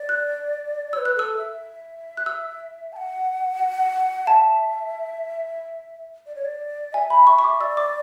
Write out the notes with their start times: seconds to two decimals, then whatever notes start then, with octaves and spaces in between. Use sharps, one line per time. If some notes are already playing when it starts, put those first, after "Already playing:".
Already playing: D5
0.09 F#6
0.93 C#5 E6
0.97 B4
1.05 F#6
1.15 A4 E6
1.37 E5
2.17 F#6
2.26 E6
2.93 A5
2.96 F#5
4.27 E5 A5
6.26 D5
6.36 C#5
6.45 D5
6.93 E5 G#5
7.10 B5
7.27 C#6
7.39 C#6
7.44 D6
7.60 D5 E6
7.77 D6